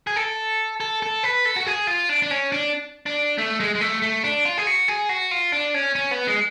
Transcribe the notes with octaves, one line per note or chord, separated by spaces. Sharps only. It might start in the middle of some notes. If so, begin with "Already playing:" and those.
G#4
A4
A4
A4
B4
A4
F#4
G#4
F4
D4
D4
C#4
D4
D4
A3
G#3
G#3
A3
A3
D4
F4
G#4
F#4
G#4
F#4
F4
D4
C#4
C#4
B3
G#3